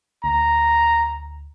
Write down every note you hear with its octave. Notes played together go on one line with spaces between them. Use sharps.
D2 A#5